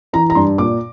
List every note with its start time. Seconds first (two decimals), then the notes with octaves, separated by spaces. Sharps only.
0.13 E3 A#5
0.30 A#5
0.35 G2 C6
0.58 A#2 D6